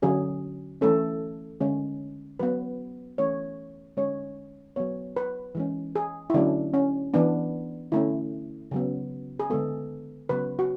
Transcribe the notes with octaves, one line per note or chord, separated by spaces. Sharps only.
D3 F#3 C#4 G#4
E3 A3 C#4 A4
D3 G#3 C#4
F#3 B3 B4
E3 A3 C#4 C#5
D3 G#3 C#4 C#5
F#3 B3 C#5
B4
E3 G#3 C#4
G#4
E4
D3 F#3 A3 C#4 D4
C#4
E3 B3 D4
D3 A3 C#4 E4
C#3 F#3 B3
G#4
D3 G#3 B3 A4
C#3 F#3 B3 B4
F#4